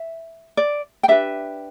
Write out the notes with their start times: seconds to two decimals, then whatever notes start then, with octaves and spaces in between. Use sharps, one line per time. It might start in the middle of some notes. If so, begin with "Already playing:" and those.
Already playing: E5
0.57 D5
1.03 G5
1.08 D4 G4 B4 E5